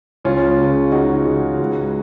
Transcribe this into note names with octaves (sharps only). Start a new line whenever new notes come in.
C#2 C#4 F4
C#3
C#3 D#4 F#4
C#3
C#2